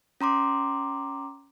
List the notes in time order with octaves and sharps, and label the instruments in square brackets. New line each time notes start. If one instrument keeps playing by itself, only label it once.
[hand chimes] C#4 A#5 C6 D6